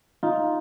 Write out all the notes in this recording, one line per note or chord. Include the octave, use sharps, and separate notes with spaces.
D#4 F4